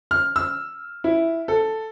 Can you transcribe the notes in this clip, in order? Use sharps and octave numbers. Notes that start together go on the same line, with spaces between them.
F6
E6
E4
A4